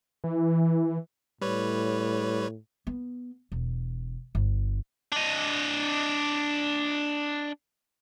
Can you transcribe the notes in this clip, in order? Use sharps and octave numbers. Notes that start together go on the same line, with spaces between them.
E3
A2 G3 B4 C#5
B3
E1
G1
D4 D#5